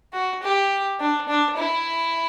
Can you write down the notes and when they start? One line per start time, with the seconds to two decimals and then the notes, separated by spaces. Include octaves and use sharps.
0.13 F#4
0.42 G4
1.00 D4
1.28 D4
1.58 E4